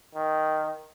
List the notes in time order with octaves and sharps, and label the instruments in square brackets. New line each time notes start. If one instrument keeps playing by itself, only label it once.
[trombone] D#3